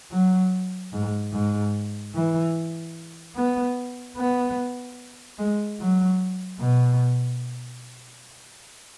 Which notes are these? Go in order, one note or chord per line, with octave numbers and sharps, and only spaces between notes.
F#3
G#2
G#2
E3
B3
B3
G#3
F#3
B2